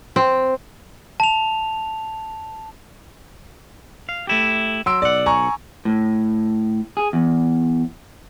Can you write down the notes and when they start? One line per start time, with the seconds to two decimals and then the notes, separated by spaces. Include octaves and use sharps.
0.16 C4
1.20 A5 F7
4.09 F5
4.27 A3 E4 G4
4.86 F#3 C6 E6 D7
5.02 B1 D5 F#5
5.26 G#5 A#5 C#6
5.85 A2
6.97 G#4
7.13 E2